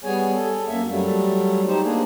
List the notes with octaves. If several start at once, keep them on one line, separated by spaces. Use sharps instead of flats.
G3 B3 G#4 C#5 G#5
A4
F#2 A#3 E5
F#3 G3 A3
D#4 G4 C5
A#3 D4 G#4